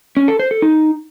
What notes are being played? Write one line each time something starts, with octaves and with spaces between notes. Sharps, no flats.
C#4
A4
C5
A4
D#4